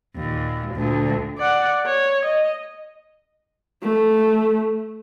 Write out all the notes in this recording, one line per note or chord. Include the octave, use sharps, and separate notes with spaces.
D#2 A#2
D2 A#2
D5 F#5
C#5
D#5
A3